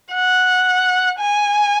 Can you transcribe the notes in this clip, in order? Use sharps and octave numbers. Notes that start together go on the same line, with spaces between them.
F#5
G#5